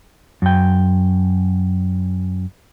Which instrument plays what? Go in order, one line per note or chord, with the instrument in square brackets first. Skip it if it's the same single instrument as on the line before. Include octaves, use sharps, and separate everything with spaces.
[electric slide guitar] F#2 G5